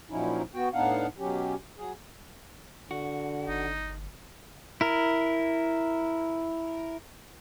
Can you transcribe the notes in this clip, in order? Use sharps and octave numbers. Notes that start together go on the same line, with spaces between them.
A#2 F3 F#3 C#4 D#4 E4
B3 F#4 G5
A2 B3 D4 D#4 F5 F#5
B2 F#3 C#4 G4
F#3 G#4
D3 F#4
G1 D#4
E4 A#4